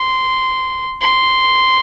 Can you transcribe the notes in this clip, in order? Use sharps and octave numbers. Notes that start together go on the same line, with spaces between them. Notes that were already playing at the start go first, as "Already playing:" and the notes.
Already playing: C6
C6